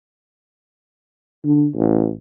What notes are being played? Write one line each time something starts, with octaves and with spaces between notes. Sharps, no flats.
D3
A1